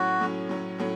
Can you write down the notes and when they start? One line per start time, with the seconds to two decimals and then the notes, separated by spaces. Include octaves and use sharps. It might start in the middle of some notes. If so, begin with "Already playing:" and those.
Already playing: A2 F#3 C#4 F#4
0.20 A2 F#3 C#4
0.49 A2 F#3 C#4
0.78 A2 F#3 C#4